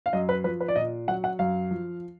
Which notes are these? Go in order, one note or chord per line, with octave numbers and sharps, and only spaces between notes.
F5
F#2 D#5
B4
F3 B4
B4
D5
A#2 D#5
F#3 F#5
F#5
F#2 F5
F3